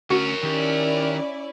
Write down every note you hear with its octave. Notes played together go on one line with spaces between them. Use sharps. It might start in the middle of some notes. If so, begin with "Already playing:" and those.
D2 C#4 F#4 A#4 C#5
D#3 C#4 E4 G4 D5